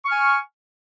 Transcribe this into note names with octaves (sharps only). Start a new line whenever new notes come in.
G#5 C#6 F6